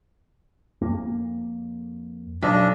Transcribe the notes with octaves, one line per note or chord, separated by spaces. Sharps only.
F2 A#3
B1 D4